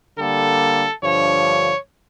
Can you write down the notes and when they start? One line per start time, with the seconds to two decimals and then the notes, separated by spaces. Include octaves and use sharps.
0.18 D3 G3 A#3 A4
1.02 G2 D3 F3 C#5